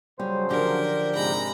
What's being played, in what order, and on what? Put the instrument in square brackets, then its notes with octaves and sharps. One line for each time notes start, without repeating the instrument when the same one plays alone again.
[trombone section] C#3 F#3 C5 [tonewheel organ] G3 [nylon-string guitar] C#4
[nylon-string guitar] D3 F3 D4 [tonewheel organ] G4 [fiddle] A#4
[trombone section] G#2 C3 [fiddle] A#5 B5